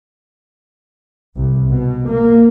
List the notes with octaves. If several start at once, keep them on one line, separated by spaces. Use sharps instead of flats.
C2
B2
A#3